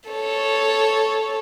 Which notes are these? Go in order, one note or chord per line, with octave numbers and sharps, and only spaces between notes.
A4 C#5